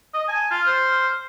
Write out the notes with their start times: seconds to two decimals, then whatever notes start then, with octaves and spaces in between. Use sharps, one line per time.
0.14 D#5
0.28 G#5 A5
0.51 F4 F6
0.66 C5